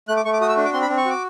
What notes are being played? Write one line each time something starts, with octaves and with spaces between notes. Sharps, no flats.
A3 F#6
D6
A3 C#6
D6
F#4 D#6
E6
D4
D6
C4 C6
B5
C4
C#6
F#4 D6